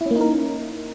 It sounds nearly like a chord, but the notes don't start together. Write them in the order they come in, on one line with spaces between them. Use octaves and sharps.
E4 C#4 A#3 D#4 A#4